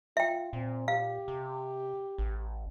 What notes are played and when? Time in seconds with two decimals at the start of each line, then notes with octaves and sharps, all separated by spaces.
0.17 F4 E5 G5
0.53 A#2 C4
0.88 G4 F5
1.28 C3
2.18 A1